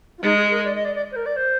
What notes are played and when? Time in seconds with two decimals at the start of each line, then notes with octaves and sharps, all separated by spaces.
0.18 F4
0.22 G#3 D#4
0.37 G#4
0.51 A#4
0.64 D5
0.74 D#5
0.84 D5
0.95 D5
1.11 C5
1.16 A#4
1.26 D5
1.36 C5